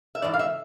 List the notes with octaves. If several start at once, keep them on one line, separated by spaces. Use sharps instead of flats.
E5
G#2 E3 D5
F5
E5